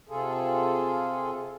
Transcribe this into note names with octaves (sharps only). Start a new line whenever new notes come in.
C3 F4 G#4 A4